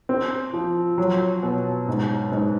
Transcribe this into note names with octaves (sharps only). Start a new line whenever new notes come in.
C4
F3
F#3
B2
G#2
G#2